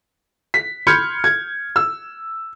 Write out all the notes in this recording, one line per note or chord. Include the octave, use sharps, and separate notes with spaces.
B6
B5 C6 F6 G6 G#6 C#7
G#6
E6